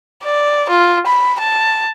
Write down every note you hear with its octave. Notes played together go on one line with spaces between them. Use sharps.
D5
F4
B5
A5